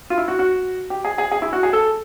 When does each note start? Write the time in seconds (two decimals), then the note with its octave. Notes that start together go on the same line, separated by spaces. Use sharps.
0.10 F4
0.18 E4
0.28 F#4
0.39 F#4
0.90 G4
1.05 G#4
1.18 G#4
1.31 G#4
1.42 E4
1.53 F#4
1.63 G#4
1.73 A4